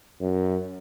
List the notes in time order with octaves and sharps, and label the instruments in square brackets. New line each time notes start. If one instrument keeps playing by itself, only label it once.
[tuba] F#2